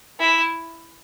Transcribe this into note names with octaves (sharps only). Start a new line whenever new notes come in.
E4